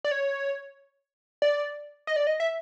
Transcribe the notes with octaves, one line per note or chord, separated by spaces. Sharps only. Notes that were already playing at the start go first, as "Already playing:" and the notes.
D5
C#5
D5
D#5
D5
D#5
E5